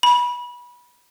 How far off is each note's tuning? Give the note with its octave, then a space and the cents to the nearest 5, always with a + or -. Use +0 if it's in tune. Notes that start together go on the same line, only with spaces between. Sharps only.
B5 -25